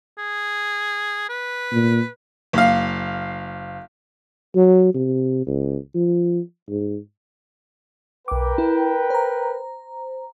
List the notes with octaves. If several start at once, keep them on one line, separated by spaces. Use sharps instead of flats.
G#4
B4
A#2
F#1 F5
F#3
C3
C#2
F3
G#2
B1 A#4 B4 G5 D6
E4
C5 A#5